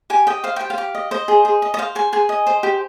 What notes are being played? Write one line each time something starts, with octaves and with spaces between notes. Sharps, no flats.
G4 G#5
D#5 G5
C5 F5
G4 G5
F5
G4
D#5
C5 D#5
G#4
G#4
D#5
D#5
C5 F5
G#4 G#5
G#4 G#5
D#5
C5
G4